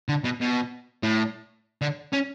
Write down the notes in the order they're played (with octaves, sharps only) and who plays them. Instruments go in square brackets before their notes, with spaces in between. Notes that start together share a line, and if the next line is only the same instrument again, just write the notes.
[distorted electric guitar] D3
B2
B2
A2
D3
C#4